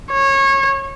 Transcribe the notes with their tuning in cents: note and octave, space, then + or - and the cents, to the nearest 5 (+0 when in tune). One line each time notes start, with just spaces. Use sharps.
C#5 -25